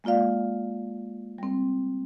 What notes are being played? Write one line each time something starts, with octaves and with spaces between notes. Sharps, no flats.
G#3 A#3 F4 D5 F5
G3 C4